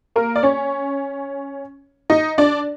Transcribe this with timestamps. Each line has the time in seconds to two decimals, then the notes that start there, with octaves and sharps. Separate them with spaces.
0.16 A#3 A#4
0.36 D5
0.43 C#4 C#5
2.10 D#4 D#5
2.38 D4 D5